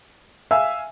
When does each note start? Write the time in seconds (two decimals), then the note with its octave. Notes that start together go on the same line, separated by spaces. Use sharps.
0.51 E5 F5 G#5 E6